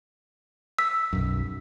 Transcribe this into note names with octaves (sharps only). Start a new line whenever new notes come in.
E6 B6
B1 F#2